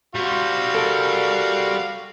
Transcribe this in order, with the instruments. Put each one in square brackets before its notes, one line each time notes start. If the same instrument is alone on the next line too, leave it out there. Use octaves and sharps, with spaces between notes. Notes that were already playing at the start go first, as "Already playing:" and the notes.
[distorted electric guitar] G3 C5 [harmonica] F#4 F5
[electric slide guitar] A4 A#4